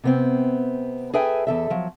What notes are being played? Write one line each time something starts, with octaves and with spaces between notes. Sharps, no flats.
C3 B3 C4
G#4 A4 B4 E5 G5 G#5
E2 A4 E5
F3 F#3